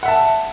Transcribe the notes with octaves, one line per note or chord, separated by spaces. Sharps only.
E5 F#5 A5